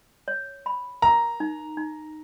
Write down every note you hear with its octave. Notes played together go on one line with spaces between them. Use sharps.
C#5
B5
A#4 A#5
D#4
D#4